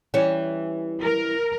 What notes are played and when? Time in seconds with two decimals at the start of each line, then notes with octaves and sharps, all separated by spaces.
0.14 E3 G3 C#4
1.03 A#4